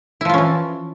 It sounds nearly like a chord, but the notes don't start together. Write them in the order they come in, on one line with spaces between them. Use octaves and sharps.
E4 F3 F4 C#4 E3